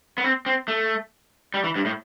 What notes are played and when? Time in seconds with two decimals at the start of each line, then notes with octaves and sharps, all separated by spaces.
0.18 B3
0.24 C4
0.46 C4
0.68 A3
1.54 G3
1.64 E3
1.76 G2
1.85 A2